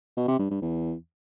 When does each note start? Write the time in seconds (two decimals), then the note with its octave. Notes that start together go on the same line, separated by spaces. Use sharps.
0.17 B2
0.28 C3
0.39 G2
0.51 G2
0.62 E2